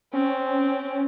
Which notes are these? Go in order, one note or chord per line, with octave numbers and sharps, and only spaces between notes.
C4 C#4